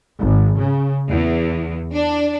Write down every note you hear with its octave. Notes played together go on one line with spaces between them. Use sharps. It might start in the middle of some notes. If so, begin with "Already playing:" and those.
G#1
C#3
E2
D4